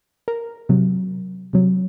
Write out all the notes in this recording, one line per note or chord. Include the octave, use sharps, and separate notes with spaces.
A#4
C3 F#3
C3 F#3